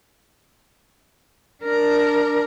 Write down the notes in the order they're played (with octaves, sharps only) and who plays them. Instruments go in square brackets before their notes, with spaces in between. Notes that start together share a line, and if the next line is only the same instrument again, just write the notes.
[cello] D4 A#4